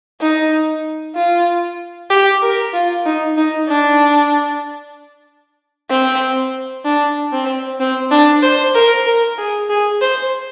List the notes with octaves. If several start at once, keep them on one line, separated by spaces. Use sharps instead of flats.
D#4
F4
G4
A#4
F4
D#4
D#4
D4
C4
D4
C4
C4
D4
C5
A#4
A#4
G#4
G#4
C5